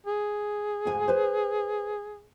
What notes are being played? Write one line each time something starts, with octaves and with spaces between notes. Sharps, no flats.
G#4
D2 G#2 G#5
B4 C5